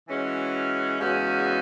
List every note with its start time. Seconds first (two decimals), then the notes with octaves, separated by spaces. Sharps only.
0.07 E3 G#3 C#4 F#4
0.99 E2 C#3 G#3 C#4 F#4